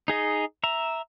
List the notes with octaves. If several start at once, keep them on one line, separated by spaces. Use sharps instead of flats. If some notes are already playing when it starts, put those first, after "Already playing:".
D#4 G#4 D#5
E5 A#5